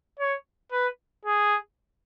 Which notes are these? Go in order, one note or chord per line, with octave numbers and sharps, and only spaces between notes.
C#5
B4
G#4